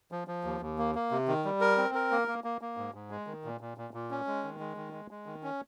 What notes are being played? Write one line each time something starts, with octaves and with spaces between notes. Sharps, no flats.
F3
F3
D#2
D#2
A#3
A#3
C3
D#3
G3
A#4
C4
A#4
A#3
A#3
A#3
A#3
G#2
G#2
G#3
D#3
A#2
A#2
A#2
A#2
C#4
G#3
D#3
G#3
D#3
G#3
G#3
D#3
C#4